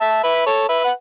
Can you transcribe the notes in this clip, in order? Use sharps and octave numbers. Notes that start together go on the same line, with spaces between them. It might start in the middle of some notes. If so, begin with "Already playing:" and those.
E5 A5
B4 E5
A4 C#5
B4 E5
F#5